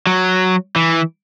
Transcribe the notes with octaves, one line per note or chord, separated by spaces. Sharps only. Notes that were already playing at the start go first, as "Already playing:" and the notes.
F#3
E3